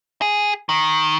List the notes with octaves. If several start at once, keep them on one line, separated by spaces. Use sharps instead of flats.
G#4
D#3